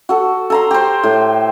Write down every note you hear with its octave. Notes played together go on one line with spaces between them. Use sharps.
F#4 A4
A4 A#5 C6
G4 C5
A2